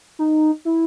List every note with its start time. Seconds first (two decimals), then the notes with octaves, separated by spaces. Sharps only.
0.19 D#4
0.65 E4